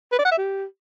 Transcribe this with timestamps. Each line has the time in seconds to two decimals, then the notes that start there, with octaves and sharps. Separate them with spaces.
0.12 B4
0.19 D5
0.25 F#5
0.32 E5
0.38 G4